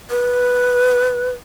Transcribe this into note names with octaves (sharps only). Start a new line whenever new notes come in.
B4